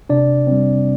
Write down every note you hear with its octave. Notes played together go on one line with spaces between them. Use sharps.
C3 D4 D5
G3 C4